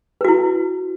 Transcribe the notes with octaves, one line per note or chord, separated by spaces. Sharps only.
E4 F#4 B4